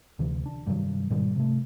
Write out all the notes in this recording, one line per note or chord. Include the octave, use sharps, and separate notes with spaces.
D2 C3 E3
D4
G2 C3 D#3 F#3
G#2 B2 D#3 G3
C3 A3